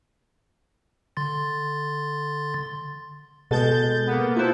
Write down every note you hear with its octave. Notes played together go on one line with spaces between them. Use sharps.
D3 C6 A6
B2 G#3 A4 G6 A6
A#3 B3
E4 F4 A4 B4 C5